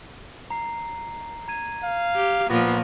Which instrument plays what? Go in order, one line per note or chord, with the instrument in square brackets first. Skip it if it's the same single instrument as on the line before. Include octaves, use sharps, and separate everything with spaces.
[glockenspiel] A#5 C7
A#5 G#6 D#7
[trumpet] F5
[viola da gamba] G4
[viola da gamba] A#2 F3 [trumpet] B3 [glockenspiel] C#6 D6 A#6